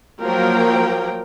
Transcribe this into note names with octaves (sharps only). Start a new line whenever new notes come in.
F3 F#3 A#3 A#4 G5